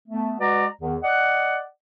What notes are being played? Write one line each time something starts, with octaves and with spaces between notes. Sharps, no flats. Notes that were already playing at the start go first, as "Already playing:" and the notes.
A3 B3
G#3 F#4 B4 D5 A#5
E2 D#3
D5 D#5 F#5